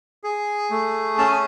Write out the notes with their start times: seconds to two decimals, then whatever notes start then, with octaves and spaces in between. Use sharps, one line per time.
0.24 G#4
0.70 A3
1.18 C#4 A5
1.28 G#5